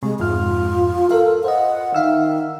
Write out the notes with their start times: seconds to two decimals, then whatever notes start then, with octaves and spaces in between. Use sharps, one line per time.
0.03 C3 G#3
0.20 F2 G#2 F4 F6
1.11 A4 A#4 F5
1.44 C5 D#5 F#5
1.95 D#3 E5 F5 E6